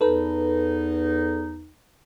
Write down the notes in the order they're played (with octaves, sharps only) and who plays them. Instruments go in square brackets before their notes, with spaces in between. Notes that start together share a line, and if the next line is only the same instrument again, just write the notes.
[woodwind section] E2 D#4 [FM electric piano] A4 B4